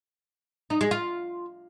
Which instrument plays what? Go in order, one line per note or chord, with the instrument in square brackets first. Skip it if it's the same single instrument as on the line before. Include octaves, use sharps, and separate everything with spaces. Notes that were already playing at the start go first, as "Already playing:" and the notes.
[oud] D#4
G#3
F4